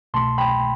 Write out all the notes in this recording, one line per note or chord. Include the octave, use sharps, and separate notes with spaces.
C2 B2 A3 A5 C6
G5 B5